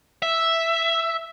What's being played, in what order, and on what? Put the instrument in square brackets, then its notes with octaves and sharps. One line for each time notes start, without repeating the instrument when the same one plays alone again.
[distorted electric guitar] E5